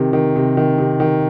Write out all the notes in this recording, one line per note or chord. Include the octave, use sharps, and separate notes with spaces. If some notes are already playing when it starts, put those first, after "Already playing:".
Already playing: C3 D#3
D#3
C3
D#3
C3
D#3